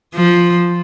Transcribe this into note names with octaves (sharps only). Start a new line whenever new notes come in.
F3